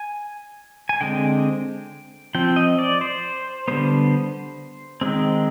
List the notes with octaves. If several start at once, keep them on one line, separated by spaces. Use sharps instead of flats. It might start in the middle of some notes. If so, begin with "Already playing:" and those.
Already playing: G#5
G#5
D3 G#3 C4 G5
F3 C4 G5
D#5
D5
C5
D3 G3 B3 C5
D#3 G#3 C4